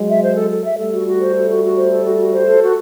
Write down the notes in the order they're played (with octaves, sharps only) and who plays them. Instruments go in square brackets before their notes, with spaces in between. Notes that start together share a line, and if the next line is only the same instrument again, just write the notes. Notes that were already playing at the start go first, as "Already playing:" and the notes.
Already playing: [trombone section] F#3 G#3
[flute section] E5
C5
A4
A4
E5
[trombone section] G3 A3 [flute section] A4
[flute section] F#4
F#4
C5
A4
F#4
F#4
C5
A4
F#4
F#4
C5
A4
F#4